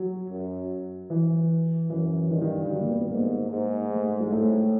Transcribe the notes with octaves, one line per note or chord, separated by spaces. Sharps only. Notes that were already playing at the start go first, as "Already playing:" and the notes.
Already playing: F#3
F#2
E3
F#2 E3
G2 D#3
D#3
D3
F#3
A#3
B3
B3
G#2 A#3
G#2
A3
G#3
A2 A3